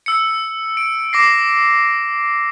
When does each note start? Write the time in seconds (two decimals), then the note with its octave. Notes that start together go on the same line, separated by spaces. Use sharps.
0.06 E6 C#7
0.77 D7
1.13 D6 A#6 C7